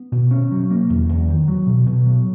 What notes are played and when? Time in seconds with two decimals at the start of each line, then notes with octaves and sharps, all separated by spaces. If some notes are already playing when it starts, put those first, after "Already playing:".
Already playing: B3
0.12 B2
0.31 C#4
0.51 F#3
0.70 A#3
0.90 E2
1.09 E2
1.28 D#3
1.48 F#3
1.67 B2
1.86 B2
2.06 F#3